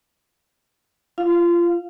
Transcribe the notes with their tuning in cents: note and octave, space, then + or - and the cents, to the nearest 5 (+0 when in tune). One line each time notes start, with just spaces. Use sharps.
F4 -25 F5 +0